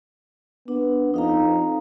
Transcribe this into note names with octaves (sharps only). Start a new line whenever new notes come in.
B3 D4
F2 D#4 F5 A#5